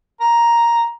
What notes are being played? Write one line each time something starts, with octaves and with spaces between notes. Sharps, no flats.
A#5